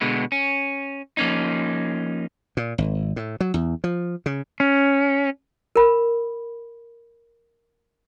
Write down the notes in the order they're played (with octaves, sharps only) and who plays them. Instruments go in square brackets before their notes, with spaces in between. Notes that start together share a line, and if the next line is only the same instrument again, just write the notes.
[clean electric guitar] B2 D3 G#3 B3
C#4
F3 A#3 C#4 D#4
[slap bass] A#2
G#1
A2
F#3
E2
F3
C#3
[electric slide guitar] C#4
[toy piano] A#4 B5